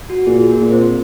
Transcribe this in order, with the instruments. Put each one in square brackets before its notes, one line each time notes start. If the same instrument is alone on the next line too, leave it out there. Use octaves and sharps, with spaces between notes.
[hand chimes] F#4
[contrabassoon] A#2 [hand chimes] G#4
[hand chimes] A#3 A#4
[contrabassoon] A#2
[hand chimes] C4 C5